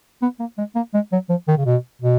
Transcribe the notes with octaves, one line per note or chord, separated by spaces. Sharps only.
B3
A#3
G#3
A#3
G#3
F#3
F3
D#3
C#3
B2
B2